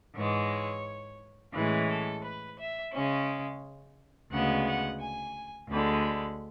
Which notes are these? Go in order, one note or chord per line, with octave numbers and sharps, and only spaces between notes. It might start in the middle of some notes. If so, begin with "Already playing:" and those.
G#2 E3 G#3 C#5
A2 E3 G#3 C#4 B4
A4
B4
E5
C#3 G#3 C#4
D2 C#3 G#3 B3 F#5
F#5
G#5
D2 D3 G#3 B5